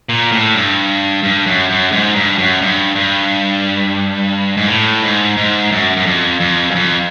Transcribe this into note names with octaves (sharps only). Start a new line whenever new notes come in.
A#2
A2
G2
G2
F#2
F#2
G#2
G2
F#2
G2
G2
G#2
A2
G#2
G#2
F#2
F#2
F2
F2
F#2
F2